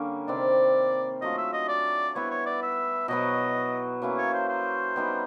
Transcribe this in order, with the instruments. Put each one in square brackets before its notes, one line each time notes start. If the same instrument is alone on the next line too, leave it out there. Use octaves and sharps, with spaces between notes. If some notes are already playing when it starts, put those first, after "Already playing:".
Already playing: [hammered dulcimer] D3 G3 A#3 C#4
[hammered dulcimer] C3 D#3 G3 C4 [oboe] D5
[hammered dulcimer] F#3 A3 D4 F4 [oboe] D#5
[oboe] E5
D#5
D5
[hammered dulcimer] G3 B3 E4 [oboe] C#5
[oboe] C#5
D5
E5
[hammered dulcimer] B2 F#3 B3 [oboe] D#5
[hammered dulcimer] F#3 A#3 C#4 E4
[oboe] C#5
C5
C5
[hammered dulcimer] G3 B3 D#4